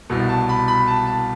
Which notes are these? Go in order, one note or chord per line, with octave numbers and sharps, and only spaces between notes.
C2 B2
A5
B5
B5
A5
A5